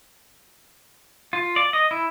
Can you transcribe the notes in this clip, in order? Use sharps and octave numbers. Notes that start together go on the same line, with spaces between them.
F4
D5
D#5
E4